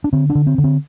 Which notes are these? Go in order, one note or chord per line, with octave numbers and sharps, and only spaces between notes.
D4
D3 C4
D4
D3
C4
D3
C4